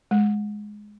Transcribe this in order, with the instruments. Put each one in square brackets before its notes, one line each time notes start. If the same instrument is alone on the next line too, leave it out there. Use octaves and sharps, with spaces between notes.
[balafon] G#3